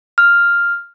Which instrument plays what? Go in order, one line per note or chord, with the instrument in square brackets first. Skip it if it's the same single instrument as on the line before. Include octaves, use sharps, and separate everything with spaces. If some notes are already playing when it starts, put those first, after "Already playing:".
[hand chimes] F6